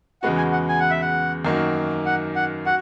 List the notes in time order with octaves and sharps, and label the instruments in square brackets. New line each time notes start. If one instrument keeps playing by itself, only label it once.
[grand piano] E2 C#3 G#3 B3 F#4 [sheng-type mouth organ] F#5
[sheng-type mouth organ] G#5
F#5
G#5
F#5
E5
F#5
[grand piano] F#2 D#3 A#3 D#4 F#4
[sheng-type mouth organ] F#5
F#5
[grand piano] F#4 [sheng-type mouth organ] F#5